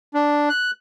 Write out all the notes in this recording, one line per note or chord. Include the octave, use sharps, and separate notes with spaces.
D4
F#6